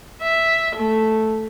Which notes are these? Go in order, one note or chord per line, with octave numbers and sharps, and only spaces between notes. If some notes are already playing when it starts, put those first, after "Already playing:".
E5
A3